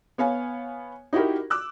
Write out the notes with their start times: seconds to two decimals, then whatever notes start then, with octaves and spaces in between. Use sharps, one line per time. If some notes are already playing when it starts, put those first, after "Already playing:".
0.18 B3 C#5 F5 G#5
1.13 D#4 E4 F#4 G4 A#4
1.50 D6 E6 F#6